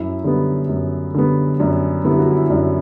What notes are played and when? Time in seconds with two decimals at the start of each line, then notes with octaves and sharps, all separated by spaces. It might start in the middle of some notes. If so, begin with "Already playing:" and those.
Already playing: F#2 E4
0.24 D3 G3 B3
0.69 F#2
1.14 D3 G3 B3
1.60 F#2 D4
2.04 D3 G3 B3 E4
2.18 F#4
2.32 E4
2.50 F#2 D4 F#4